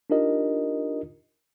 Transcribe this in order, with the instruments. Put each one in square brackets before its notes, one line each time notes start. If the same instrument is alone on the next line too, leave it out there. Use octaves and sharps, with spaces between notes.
[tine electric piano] D4 D#4 F4 G4 A#4 D#5